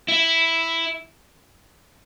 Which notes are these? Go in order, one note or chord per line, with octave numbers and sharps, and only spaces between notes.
E4